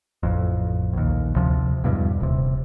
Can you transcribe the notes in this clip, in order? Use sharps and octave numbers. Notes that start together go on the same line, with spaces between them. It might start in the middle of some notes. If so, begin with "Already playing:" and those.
A1 F2
A#1 D#2
D2 C3 F3
E2 G2 B2
D#1 C3